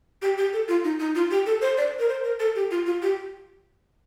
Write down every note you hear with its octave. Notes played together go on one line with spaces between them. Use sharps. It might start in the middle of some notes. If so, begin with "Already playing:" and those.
G4
G4
A4
F4
D#4
D#4
F4
G4
A4
C5
D5
A#4
C5
A#4
A4
G4
F4
F4
G4